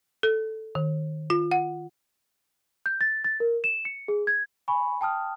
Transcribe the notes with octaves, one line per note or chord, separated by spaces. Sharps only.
A4
D#3
F4
F#5
G6
A6
A6
A#4
E7
C#7
G#4
G#6
G#5 B5 C#6
G5 A5 D#6 F6